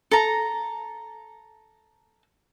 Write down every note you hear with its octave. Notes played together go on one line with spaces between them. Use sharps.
A4 A#5